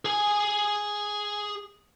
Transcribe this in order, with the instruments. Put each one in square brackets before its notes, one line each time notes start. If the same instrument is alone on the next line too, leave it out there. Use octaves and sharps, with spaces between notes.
[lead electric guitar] G#4 G#5